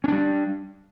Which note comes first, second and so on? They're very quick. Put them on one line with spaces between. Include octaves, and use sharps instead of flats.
C#4 D4 G3